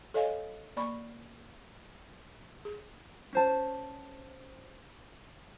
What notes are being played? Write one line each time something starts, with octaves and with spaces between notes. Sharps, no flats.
A4 C#5 D#5 F5 G#5
A#3 D5 B5 C#6
G#4
C#4 C5 A5